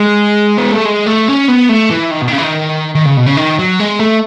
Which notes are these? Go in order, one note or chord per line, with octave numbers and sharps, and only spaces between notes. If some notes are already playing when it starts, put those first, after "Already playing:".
Already playing: G#3
B3
A3
G#3
A3
C#4
B3
A3
E3
D#3
B2
D#3
C#3
E3
D#3
D#3
C#3
B2
C#3
D#3
F#3
G#3
A3